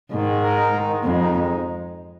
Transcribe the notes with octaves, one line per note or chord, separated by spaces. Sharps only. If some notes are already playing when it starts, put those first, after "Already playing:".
G#2 D#3
G#3
A#4
D#4
D#3
G#3
F2 G#3
D#4
G#3